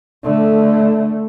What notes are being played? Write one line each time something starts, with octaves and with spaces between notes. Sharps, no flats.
D3 A3